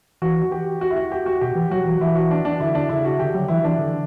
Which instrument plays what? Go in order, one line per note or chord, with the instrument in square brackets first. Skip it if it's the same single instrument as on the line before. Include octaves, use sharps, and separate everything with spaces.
[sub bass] E3 [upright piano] F#4
[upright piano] F#4
G4
F#4
E4
F#4
G4
F#4
[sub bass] B2 [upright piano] G4
[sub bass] E3
[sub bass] F#3 [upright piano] F#4
[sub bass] E3
[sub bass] E3 [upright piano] E4
[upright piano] F#4
D4
D4
[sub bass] D3 [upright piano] E4
[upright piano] D4
[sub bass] C#3 [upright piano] E4
[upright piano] F#4
[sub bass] D3 [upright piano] G4
[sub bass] F#3
[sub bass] E3 [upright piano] E4
[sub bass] E3 [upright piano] D4
[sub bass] D3